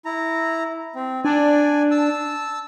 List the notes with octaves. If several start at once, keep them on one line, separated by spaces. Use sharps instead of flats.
E4 A#5
C4
D4 D5 G#5
A5 E6